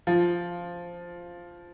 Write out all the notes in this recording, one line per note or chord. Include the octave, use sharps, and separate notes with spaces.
F3